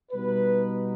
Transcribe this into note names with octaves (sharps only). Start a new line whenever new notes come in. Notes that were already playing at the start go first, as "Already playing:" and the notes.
B2 G3 B3 D#4 B4